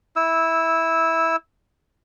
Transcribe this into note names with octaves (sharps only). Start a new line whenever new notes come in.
E4 E6